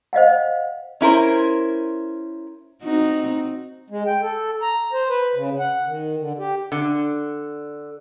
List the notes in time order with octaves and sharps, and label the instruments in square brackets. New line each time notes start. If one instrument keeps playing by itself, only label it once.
[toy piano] C5 D#5 F5 F#5
[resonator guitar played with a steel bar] C#4 E4 A#4 C5
[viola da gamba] C4 D#4 F#4
[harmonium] G#3
G5
A4
A#5
C5
B4
C#3
F#5
D#3
D3
G4
[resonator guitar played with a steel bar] D3